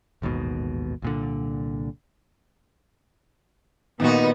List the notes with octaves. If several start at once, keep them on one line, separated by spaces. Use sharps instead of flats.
A1 D#2 G#2 B2
C2 A#2 D3
A#2 D#3 B3 D#4 F#4 B4